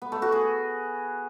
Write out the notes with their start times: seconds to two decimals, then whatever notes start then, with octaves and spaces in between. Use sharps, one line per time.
0.02 B3
0.12 A3
0.22 F#4
0.32 G#4